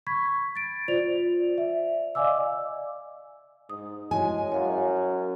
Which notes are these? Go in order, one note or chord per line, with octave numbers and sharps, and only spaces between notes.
B5 C#6 G#6 B6
A6 D7
F4 C5 D5 F7
E5
D5 D#5 F5 G#5 D6 E6
G#2 D#6
G#3 E4 F#4 C#5 G#5
F#2 C#5 F5